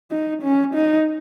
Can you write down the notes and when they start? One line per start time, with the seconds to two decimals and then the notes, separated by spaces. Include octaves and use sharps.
0.11 D#4
0.42 C#4
0.75 D#4